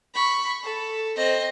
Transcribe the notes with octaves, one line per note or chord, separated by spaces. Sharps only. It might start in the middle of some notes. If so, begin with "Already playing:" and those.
B5 C#6
A4
C4 D#5